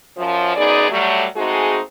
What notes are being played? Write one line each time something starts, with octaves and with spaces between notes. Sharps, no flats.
F#2 F3
F#2 B3 D#4 G#4 D5
F#3 G3 A3
G#3 A3 C4 D#4 F#4 G#4